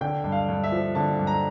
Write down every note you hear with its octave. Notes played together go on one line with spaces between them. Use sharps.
D3 G5
G2
F5
G2
E5
F3
D3 A5
G2
A#5